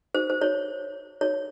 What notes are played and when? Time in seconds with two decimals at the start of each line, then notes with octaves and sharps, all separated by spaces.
0.15 C5
0.30 C5
0.41 C#5
1.21 C#5